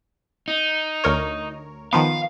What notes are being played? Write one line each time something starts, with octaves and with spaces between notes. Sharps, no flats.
D#4
D2 A#4 C#5
D#3 F3 B3 F5